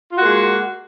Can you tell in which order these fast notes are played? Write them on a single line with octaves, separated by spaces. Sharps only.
F4 F#4 A#3 G#3